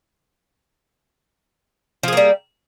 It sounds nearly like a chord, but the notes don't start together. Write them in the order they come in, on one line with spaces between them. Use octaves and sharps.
F3 G#4 A#3 G3